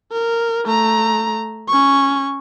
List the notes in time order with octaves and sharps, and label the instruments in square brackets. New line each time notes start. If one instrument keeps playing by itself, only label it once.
[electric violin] A#4
A3 A#5
C#4 C#6